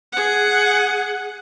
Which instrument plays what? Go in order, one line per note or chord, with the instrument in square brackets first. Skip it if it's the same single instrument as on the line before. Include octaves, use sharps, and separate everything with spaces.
[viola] G#4 F#5